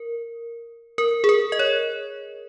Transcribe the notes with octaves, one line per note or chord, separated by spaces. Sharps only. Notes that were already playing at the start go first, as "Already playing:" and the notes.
Already playing: A#4
A#4
G#4
A#4
D#5
C#5